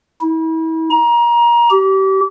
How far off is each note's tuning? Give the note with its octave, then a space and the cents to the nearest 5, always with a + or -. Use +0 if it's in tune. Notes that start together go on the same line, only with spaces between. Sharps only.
E4 -35
A#5 +25
G4 -30